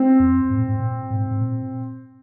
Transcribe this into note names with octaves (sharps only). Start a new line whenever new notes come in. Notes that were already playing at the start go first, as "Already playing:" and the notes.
Already playing: C4
F2
G#2
A#2
G#2
A#2
G#2
G#2
A#2